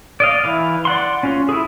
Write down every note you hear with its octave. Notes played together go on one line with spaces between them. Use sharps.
D5 D#5 F5
E3 E4 F5
D5 F#5 C6
C#4 F4
E4 G#4